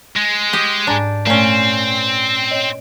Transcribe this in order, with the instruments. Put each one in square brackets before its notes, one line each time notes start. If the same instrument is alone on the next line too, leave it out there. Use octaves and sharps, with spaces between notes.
[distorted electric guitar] G#3
[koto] G4 D#5
[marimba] G#2 G#5 A#5 [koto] D4
[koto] A#2 C#4 [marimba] A3 [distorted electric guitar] C4
[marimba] C#5 D#5